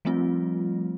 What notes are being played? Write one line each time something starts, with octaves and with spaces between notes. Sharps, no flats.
F3 G3 A3 C4 F4